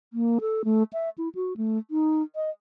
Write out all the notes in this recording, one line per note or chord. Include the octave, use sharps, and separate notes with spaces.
A#3
A4
A3
E5
E4
F#4
A3
D#4
D#5